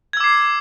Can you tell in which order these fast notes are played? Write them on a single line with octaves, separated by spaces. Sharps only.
G#6 E6 D6 C7